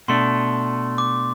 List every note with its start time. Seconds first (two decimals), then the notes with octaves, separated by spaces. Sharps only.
0.08 B2 A3 D4 C6
0.98 D6